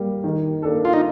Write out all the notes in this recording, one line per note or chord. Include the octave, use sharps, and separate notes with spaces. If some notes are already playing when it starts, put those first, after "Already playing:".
Already playing: G3 A#3
D#3
A#3 D4 A4
F4
D#4